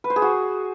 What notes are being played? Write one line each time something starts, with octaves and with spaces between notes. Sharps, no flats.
B4
C5
G#4
F#4